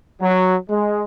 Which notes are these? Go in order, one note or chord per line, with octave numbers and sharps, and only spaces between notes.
F#3
G#3